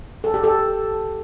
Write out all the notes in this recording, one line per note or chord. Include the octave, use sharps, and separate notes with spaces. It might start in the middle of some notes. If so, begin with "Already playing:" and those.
A4
G4
A4